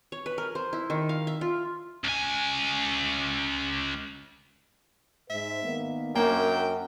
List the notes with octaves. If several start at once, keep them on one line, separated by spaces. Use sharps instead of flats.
C#5
B4
A#4
C5
E4
D#3
F5
E5
F4
C#2 G#5
G#2 C5 E5
D#3 A#3 B3
F#2 A#3 C#4 D4 F#4 G5